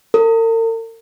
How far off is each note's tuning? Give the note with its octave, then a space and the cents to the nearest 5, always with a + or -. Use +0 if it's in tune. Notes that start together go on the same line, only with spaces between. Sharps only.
A#4 -45